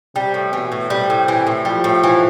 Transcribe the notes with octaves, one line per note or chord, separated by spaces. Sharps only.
C3 G3
A2
B2 E3
A2
C3 G3
A2
E3
A2
F3 G3
A2
E3